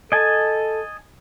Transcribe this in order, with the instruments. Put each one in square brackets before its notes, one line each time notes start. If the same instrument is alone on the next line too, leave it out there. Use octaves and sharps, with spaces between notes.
[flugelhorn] A4 [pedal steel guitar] D#5 G#5 A5